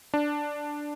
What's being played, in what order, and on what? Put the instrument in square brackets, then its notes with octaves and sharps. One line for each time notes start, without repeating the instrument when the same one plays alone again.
[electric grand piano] D4